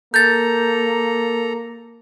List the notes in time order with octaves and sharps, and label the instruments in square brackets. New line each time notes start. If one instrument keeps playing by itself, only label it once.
[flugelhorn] A#3 [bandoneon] A4 A#5 [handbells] G6 A6